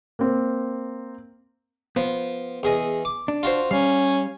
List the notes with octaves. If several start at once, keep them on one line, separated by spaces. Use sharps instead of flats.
A#3 C4
F3 B3
E2 G#4 D#5
D6
D4
F4 F#4 C5
G3 C#4 F5